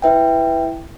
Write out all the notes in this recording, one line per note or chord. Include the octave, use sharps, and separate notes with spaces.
E4 B4 E5 G5